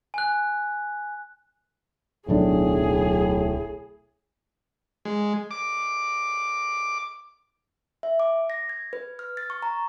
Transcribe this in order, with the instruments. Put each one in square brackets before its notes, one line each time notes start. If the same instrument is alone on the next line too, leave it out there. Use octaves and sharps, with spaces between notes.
[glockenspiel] G#5 F#6
[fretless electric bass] D1 B1 D4 [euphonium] A2 [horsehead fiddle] G#4
[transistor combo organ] G#3
D6
[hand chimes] E5
D6
A#6
G#6
B4
F6
A6
C#6
A#5